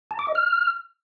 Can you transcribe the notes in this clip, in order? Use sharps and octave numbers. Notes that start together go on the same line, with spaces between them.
A5
D6
D#5
F6